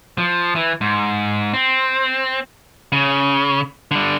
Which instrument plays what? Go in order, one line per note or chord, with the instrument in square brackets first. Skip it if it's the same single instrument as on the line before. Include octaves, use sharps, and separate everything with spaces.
[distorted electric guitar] F3
E3
G#2
C4
[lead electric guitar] C#3
D3 G3